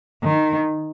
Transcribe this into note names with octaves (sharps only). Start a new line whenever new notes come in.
D#3